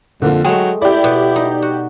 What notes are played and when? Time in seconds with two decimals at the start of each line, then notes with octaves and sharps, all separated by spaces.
0.22 F2 D3 A#3 F4
0.44 F#3 G#3 A3 G5
0.82 E4 G4 D5
1.04 B2
1.36 D#4
1.62 F#4